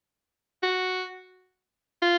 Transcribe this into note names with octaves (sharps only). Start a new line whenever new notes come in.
F#4
F4